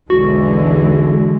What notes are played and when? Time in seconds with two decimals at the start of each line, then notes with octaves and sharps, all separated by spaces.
0.10 B1 E2 D3 E3 G#3 F#4